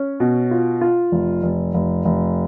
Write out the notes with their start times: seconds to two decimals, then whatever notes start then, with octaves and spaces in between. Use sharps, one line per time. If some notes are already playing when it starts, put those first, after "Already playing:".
Already playing: C#4
0.20 B2
0.51 F4
0.81 F4
1.12 F1
1.43 F1
1.74 F1
2.05 F1